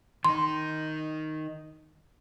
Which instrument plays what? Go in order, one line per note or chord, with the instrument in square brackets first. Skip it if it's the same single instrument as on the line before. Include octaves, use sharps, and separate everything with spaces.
[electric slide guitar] D#3 D#4 [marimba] C6